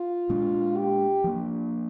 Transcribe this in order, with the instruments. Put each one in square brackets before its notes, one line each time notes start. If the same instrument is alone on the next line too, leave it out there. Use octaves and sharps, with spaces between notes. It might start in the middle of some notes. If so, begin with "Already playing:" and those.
Already playing: [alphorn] F4
[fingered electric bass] A#2 G#3 D4
[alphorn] G4
[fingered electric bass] F3 A#3 D4